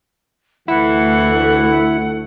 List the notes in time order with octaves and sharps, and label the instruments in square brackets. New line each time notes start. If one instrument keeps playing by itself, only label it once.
[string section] D2 A3 [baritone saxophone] E3 [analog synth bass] E4 [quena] F#5